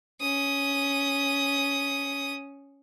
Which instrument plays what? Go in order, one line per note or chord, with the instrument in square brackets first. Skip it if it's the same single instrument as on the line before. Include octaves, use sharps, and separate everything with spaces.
[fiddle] C#4 D#6